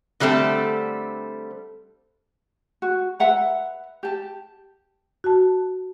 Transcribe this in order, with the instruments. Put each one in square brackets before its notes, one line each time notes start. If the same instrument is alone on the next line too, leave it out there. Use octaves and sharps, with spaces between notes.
[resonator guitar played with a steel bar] D3 G3 A3 C4 A4
[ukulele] F#4
B4 E5 F#5 A#5
G4 A5
[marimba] F#4 A5